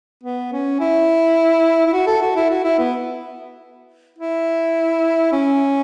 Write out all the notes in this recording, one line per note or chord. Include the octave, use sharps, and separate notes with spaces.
B3
C#4
E4
E4
F#4
A4
F#4
E4
F#4
E4
B3
E4
C#4